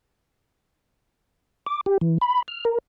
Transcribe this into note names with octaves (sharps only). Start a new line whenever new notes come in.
D6
G4
E3
B5
F6
A#4